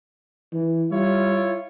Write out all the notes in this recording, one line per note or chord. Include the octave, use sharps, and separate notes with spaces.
E3
G3 E4 F4 C#5